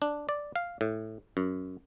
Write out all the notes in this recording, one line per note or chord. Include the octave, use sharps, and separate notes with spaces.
D4
D5
F5
A2
F#2